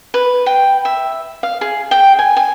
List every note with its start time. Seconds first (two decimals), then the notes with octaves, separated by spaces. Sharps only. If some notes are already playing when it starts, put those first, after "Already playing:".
0.14 B4
0.46 G5
0.85 E5
1.43 F5
1.61 G#4
1.91 G5
2.19 G#5
2.37 G#5